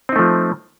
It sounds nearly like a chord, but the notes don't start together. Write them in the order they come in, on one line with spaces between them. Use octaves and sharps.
C4 D#4 A3 F3